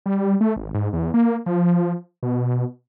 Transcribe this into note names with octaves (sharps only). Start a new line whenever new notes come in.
G3
A3
G#1
G#2
E2
A#3
F3
B2